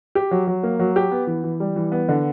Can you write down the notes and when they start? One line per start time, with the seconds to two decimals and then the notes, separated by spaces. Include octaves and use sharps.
0.15 G4
0.31 F#3
0.47 F#3
0.63 A#3
0.79 F#3
0.96 G4
1.11 B3
1.27 E3
1.44 E3
1.60 G3
1.76 E3
1.92 B3
2.09 D3